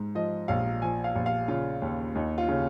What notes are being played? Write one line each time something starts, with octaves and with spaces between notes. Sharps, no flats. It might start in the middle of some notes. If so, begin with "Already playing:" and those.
Already playing: G#2
F3 D#5
A#1 F5
F3 G#5
F5
A#1
F5
C#3 F4
D#2
D#2 D#4
F4
C#3